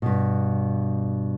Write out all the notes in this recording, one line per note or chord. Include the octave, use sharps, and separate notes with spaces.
G2 B2